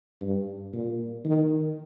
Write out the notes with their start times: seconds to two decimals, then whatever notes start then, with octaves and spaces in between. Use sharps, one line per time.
0.21 G2
0.73 A#2
1.25 D#3